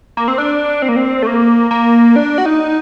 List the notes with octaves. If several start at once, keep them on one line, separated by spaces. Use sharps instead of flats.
A#3
C4
D4
C4
A#3
C4
A3
A#3
A#3
D4
F#4
D#4